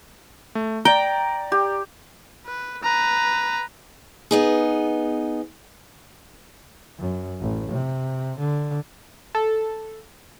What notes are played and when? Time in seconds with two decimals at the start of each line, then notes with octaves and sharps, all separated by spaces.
0.55 A3
0.85 D5 G5 A#5
1.52 G4
2.46 B4
2.83 B4 A#5
4.31 B3 D#4 G#4
6.99 F#2
7.41 A1
7.72 C3
8.39 D3
9.35 A4